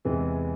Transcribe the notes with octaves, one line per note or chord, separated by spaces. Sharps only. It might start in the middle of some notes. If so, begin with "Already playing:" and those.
E2 C3 E3 G#3